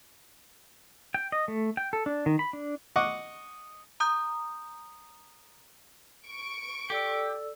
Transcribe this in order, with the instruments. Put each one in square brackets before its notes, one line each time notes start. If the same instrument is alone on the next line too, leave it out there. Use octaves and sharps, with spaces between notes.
[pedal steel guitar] G5
D#5
A3
G5
A4
D4
D#3
B5
D4
[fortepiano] D#5 F#5 C#6 D6
[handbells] A#5 D#6 G6
[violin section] C#6 D7
[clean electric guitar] G4 [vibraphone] A4 D5 E6